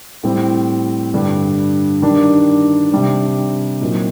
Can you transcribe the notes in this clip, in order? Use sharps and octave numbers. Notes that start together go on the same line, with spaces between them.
A2 G3 C4
G2 D3 G3
G2 D#3 G3 D4
C3 G3 D4
A#2 F#3 C4 D#4